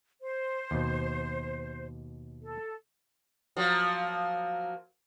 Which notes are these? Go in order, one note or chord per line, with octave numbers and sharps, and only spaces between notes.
C5
D#2 B2
A4
F3 F#3 A#3